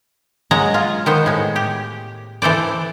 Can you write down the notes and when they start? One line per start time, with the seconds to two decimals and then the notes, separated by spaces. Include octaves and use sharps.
0.51 F#3 G#3 A#5
0.74 F4
1.06 D#3 B3 C5
1.26 A2 G#3
1.56 G4
2.42 E3 A4 C5 D5